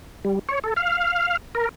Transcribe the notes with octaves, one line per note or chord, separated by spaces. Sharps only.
G3
C#5
A4
F5
A#4